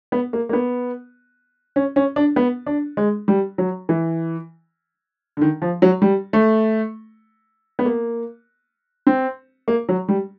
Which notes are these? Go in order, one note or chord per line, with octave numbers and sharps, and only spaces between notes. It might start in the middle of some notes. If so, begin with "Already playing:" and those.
B3
A#3
A#3
B3
C#4
C#4
D4
B3
D4
G#3
G3
F#3
E3
D3
D#3
F3
F#3
G3
A3
B3
A#3
C4
A#3
F#3
G3